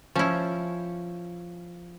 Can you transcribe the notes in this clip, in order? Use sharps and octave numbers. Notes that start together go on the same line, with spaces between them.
F3 C#4 E4 C#5